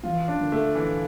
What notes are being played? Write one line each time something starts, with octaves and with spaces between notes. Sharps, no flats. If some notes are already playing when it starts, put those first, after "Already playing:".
E3 F4
D4
D3
A3
E3